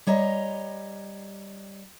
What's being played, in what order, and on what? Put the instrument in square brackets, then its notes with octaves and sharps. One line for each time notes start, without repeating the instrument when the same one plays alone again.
[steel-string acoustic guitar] G3 C#5 D#5 A#5